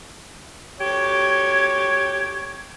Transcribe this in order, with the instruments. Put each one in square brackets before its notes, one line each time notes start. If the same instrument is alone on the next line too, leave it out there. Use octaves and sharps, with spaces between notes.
[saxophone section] D2 G4 [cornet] C#5 [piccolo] G#6